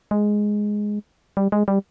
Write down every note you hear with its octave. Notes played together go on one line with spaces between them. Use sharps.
G#3
G3
G#3
G3